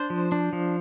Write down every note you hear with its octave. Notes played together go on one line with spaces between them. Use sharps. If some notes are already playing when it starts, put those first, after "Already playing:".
Already playing: D4 C5
F3
D4
F3